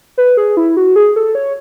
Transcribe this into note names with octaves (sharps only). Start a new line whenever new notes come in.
B4
G#4
E4
F#4
G#4
A4
C#5